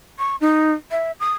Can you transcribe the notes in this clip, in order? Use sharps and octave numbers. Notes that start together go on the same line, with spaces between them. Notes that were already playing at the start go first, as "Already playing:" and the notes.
C#6
D#4
E5
D#6